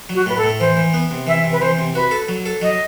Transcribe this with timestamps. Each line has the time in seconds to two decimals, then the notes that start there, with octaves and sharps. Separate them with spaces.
0.09 F#3
0.15 F#4
0.26 A2 B4
0.38 A4
0.44 A2
0.60 E3 C5
0.77 E3
0.94 B3
1.11 C3
1.27 E3 E5
1.44 C3
1.52 B4
1.62 E3 C5
1.78 C3
1.95 F#4 B4
2.11 A4
2.28 F#3
2.46 A4
2.62 F#3 D#5